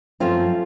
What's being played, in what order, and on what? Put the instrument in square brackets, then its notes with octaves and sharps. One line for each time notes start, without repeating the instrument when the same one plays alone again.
[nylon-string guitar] F#2 F3 A3 C4 C#4 F4